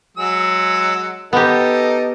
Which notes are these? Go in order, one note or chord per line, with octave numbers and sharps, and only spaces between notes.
F#3 G#3 E6
B3 D#4 G4 A4 A#4